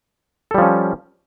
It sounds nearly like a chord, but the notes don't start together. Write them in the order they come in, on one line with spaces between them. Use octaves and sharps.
A4 G3 F3 C#4